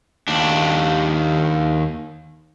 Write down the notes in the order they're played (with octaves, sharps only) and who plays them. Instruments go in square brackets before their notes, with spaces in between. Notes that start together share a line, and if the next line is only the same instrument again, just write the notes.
[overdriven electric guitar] D#2 D4